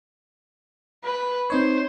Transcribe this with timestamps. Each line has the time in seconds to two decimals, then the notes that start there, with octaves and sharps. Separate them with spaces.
1.04 B4
1.50 C4 D#4 C5 C#5